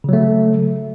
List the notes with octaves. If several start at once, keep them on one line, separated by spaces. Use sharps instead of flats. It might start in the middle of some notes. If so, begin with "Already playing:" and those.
C#3 F#3 A3